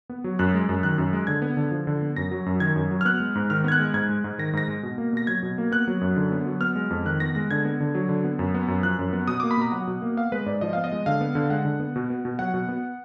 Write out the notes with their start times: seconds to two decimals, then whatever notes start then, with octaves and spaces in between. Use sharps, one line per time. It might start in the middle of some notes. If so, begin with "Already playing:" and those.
0.10 B3
0.24 F#3
0.39 F#2 F#6
0.54 G#3
0.69 F#2
0.83 D#3 F#6
0.98 F#2
1.13 G#3
1.27 D3 G#6
1.42 B3
1.57 D3
1.71 F3
1.87 D3
2.02 B3
2.16 F#2 A#6
2.31 F#3
2.46 F#2
2.60 D#3 G#6
2.76 F#2
2.91 F#3
3.01 F6
3.05 B3 F#6
3.20 G#3
3.35 G#2
3.50 D#3 F6
3.64 B3 G#6
3.72 F#6
3.80 G#3
3.94 G#2 G#6
4.09 G#3
4.24 G#2
4.39 D#3 A#6
4.53 G#2 A#6
4.68 G#3
4.83 B2
4.98 A#3
5.13 B2 A#6
5.27 F#3 G#6
5.43 B2
5.58 A#3
5.72 B3 F#6
5.87 F#3
6.01 F#2
6.16 D3
6.32 B3
6.46 F#3
6.61 B3 F6
6.75 G#3
6.90 F2
7.05 D#3 F#6
7.20 B3 A#6
7.35 G#3 A#6
7.51 D3 G#6
7.65 B3
7.80 D3
7.95 F#3
8.09 D3
8.24 B3
8.39 F#2
8.54 B3
8.68 F#2
8.83 F3 F#6
8.99 F#2
9.13 B3
9.28 B2 D#6
9.40 A#3 D6
9.51 B5
9.57 B2 A#5
9.72 F#3 F#5
9.87 B2
10.02 A#3
10.17 B3 F5
10.32 G#3 B4
10.46 G#2 D5
10.61 F3 D#5
10.73 B3 F5
10.84 D#5
10.92 G#3
11.06 D3 F5
11.21 B3
11.35 D3
11.50 G#3 F#5
11.65 D3
11.80 B3
11.96 B2
12.10 B3
12.25 B2
12.39 F#3 F#5
12.54 B2
12.69 B3